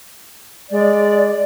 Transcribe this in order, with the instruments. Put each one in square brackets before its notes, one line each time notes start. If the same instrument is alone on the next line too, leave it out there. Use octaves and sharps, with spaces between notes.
[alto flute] G#3 [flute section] D5